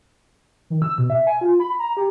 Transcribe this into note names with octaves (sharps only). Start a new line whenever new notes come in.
D#3
E6
B2
E5
G#5
F4
B5
A#5
G4